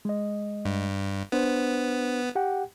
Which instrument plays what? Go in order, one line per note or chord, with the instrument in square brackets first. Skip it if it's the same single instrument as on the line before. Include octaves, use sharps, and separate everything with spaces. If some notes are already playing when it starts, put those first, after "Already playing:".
[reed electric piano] G#3 D#5
[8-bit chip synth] G2
[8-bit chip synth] B3 [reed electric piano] D4 C5
[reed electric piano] G4 F#5 G5